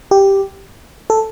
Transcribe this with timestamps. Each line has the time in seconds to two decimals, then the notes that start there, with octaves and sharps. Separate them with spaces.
0.11 G4
1.10 A4